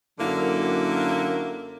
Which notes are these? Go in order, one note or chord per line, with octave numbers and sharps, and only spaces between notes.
F#2 D3 F#3 A#3 E4 A#4